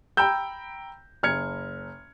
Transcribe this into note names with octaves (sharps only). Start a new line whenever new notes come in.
G5 A#5 B5 E6 G6
F#1 F6 G#6 C#7